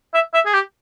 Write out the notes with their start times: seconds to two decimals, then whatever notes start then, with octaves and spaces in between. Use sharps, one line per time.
0.14 E5
0.34 E5
0.46 G#4
0.53 G4